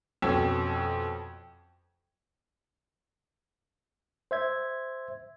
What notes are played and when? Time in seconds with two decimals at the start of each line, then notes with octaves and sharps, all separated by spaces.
0.22 F2 B2 C#4 A4 G#6
4.31 C5 E5 G#6